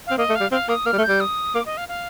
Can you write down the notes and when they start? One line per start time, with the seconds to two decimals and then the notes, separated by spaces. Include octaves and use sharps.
0.07 C4 F5
0.18 A#3 D#5
0.30 A3
0.35 F5
0.41 G3
0.51 C4 F5
0.69 A#3 D#6
0.86 A#3 F6
0.93 G3
0.98 A3
1.03 G6
1.09 G3
1.20 D#6
1.54 A#3 D6
1.66 D#5
1.77 F5
1.89 F5